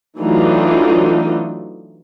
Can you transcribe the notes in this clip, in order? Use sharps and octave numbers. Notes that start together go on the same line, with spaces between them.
E3 F#3 A3 D4 D#4 F4